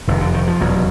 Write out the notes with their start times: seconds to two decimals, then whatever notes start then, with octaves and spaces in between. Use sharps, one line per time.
0.08 F1 F2 C3 D#3
0.21 D3
0.34 D#3
0.47 F3
0.60 F1 E2 B2 F#3